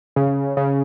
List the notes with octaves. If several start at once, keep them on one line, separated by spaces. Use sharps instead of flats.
C#3
C#3